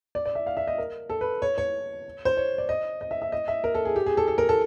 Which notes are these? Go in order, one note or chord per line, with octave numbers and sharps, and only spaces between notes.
D5
D5
E5
F5
E5
D#5
A#4
A4
B4
C#5
C#5
C5
C#5
D5
D#5
D#5
E5
E5
D#5
E5
A#4
A4
G#4
G4
G#4
A4
A4
A#4
A4